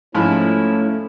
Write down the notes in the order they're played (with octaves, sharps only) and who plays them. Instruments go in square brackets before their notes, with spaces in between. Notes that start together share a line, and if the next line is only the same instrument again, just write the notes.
[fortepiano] G#2 F3 B5 [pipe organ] A3 C#4 [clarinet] E4